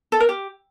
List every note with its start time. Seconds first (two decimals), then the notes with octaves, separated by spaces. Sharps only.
0.12 A4
0.20 A#4
0.29 G4